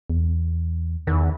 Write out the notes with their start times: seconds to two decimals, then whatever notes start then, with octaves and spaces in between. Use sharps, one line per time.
0.10 E2
1.07 E2 D#3